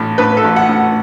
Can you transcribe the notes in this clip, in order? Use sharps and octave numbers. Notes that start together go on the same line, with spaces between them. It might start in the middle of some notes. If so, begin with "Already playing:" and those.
Already playing: A1 A2
A2 B4
A4
A1
F#5
A2